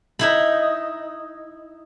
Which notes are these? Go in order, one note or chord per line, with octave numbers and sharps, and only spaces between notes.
D#4 E4 B5